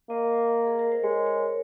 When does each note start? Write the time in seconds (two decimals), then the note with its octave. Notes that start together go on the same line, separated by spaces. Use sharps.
0.10 A#3 D#5
0.67 G#4
0.79 A#4
0.92 C5
1.04 G#3 C#5
1.27 C#5